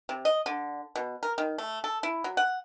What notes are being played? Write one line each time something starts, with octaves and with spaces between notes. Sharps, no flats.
C3
D#5
D3
B2
A#4
D#3
A3
A4
E4
F#3
F#5